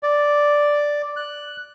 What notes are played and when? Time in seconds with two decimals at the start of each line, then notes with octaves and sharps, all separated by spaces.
0.03 D5
1.16 F#6